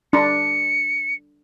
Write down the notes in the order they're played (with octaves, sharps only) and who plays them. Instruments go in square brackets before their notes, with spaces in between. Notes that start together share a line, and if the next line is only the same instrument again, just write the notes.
[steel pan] D4 [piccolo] C#7